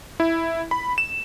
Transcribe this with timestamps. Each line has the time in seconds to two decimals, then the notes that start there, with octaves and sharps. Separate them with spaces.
0.20 E4
0.71 B5
0.98 E7